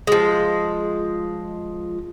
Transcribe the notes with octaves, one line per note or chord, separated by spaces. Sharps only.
F3 G#3